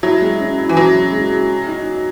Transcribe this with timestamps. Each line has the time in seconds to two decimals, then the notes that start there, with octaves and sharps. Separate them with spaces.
0.03 F#3 E4
0.22 G#3
0.40 C#4
0.58 E4
0.69 E3
0.76 F#3 C#4
0.94 C#3
1.12 G#3
1.31 G#3
1.49 F#4
1.67 D#4
1.86 D#4